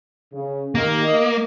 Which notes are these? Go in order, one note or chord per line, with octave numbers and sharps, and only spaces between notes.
C#3
D#3 A#3 G4
D#5